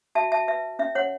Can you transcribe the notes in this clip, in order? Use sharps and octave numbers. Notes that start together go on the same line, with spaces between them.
F#4 E5 A5
E5 A5
B4 E5
C#4 E5
C#5 F#5